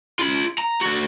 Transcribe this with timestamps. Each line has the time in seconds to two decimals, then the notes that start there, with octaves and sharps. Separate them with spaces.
0.19 F4 B5
0.58 A#5
0.81 D3 F#4